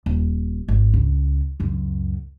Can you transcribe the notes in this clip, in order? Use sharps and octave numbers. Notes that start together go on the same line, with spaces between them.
D#1
G#1
C#2
C#2 F#2